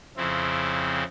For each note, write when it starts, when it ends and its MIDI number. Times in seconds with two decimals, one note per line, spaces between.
0.17 1.03 41
0.17 1.03 49
0.17 1.03 60
0.17 1.03 64